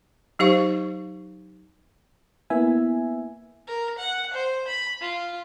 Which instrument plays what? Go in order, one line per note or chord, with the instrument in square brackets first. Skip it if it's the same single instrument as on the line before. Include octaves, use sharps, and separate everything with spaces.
[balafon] F#3 D#4 G4 C5 F5 C#6
[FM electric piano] A#3 B3 E4 E5 G#5
[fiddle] A#4
F#5
C5
B5
F4